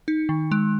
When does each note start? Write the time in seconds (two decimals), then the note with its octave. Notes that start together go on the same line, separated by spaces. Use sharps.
0.08 D#4
0.29 D#3
0.52 G#3